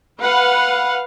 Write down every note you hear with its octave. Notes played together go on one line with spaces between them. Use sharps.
B4 F5 F#5